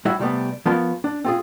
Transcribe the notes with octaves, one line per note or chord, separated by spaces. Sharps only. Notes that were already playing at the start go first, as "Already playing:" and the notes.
G3 E4 F#4 C#5 E5
C3 G3 A3 B3
F3 B3 A#4 C#5 A5 C6
D4
C4 F4 G#4